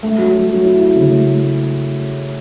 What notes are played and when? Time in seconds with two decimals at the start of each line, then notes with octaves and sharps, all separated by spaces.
0.03 A3
0.18 F#3
0.34 F#3
0.49 F#3
0.65 E4
0.80 E4
0.96 C#3
1.11 A3
1.26 A3